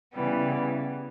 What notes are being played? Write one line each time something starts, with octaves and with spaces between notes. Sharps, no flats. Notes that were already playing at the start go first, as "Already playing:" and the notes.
C#3 E3 G3 B3